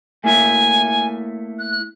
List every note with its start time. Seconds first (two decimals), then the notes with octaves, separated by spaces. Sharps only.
0.24 A3 A#3 E4 G#5
1.59 F#6